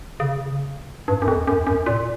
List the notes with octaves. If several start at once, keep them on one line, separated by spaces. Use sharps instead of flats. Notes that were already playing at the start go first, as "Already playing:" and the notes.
C#3
G2
F#2
F2
F#2
F#2
A#2